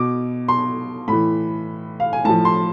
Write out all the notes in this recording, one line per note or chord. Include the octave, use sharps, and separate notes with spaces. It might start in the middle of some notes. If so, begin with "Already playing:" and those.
Already playing: B2 D6
C6
A2 E3 B5
F5
G#5
A2 F3 A5
C6